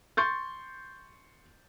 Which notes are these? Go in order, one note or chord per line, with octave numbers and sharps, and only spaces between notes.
C6 C#6 G6 A6